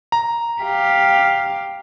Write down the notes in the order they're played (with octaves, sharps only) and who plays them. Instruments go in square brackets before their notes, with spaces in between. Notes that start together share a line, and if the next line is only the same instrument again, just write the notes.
[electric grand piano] A#5
[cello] G4 F5